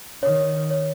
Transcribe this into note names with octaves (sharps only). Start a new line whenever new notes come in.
D#3 C#5
C#5